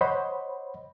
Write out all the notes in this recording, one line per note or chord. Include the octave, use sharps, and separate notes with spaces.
C5 C#5 D#5 F#5 B5